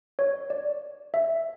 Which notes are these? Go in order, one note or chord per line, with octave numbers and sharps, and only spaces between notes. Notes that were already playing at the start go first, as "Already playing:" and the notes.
C#5
D5
E5